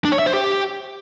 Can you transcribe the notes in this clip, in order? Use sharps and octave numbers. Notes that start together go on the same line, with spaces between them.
D4
C#5
E5
C5
G4